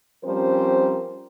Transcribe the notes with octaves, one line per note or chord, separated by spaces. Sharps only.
F3 G3 C4 C#4 A#4 C5